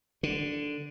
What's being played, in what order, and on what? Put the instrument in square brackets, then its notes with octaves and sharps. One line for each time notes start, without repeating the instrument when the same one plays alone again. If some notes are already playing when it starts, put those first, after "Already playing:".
[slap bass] D3